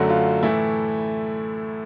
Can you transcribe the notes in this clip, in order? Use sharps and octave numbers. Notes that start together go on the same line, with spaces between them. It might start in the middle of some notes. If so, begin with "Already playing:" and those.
Already playing: F#2 D3 F#3 A3 F#4
F4
A2 E3 A3 E4